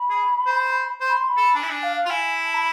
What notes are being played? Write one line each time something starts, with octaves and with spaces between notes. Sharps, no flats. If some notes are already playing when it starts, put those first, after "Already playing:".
Already playing: B5
G#4
C5
C5 C6
B5
C6
B5
A4
D4 G#5
E4
D4 G#5
F5
F5
F4
E4 G#5
A5
B5